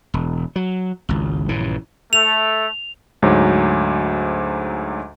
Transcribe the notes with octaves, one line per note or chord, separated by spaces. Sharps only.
E1
F#3
G#1 C#2
A#1 G2 C#3 E3
A3 F7
D2 G#2 F#3